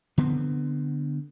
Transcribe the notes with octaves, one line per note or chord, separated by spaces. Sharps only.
D3 B3 C4